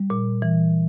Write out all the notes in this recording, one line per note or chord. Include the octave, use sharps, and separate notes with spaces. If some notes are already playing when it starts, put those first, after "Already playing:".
Already playing: G3
A#2
E3